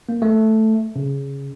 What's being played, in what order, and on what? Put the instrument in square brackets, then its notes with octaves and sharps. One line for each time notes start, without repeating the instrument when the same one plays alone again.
[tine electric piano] A#3
A3
C#3